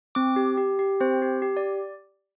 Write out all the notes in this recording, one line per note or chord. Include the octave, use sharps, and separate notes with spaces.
C4 D6
G4
G4
G4
C4 C5
G4
G4
D5